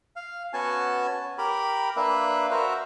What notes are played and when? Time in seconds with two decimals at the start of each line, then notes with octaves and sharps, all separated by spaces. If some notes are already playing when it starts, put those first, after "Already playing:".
0.16 F5
0.53 B3 C#4 F#4 G#5 A5
1.38 G4 A#4 B5
1.96 A#3 D4 B4 E5
2.51 F#4 A#4 C5 E5